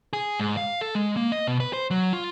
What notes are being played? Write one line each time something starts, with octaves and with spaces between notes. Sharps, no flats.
G#4
G#2
F5
A4
G#3
A#3
D#5
B2
B4
C5
F#3
F4